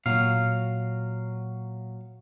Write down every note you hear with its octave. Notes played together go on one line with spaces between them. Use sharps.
A#2 F#3 F5